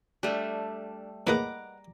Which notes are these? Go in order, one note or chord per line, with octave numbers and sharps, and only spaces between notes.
G3 A3 D4
A2 A#3 G#4 B4 D#5 F#5 A#5 D6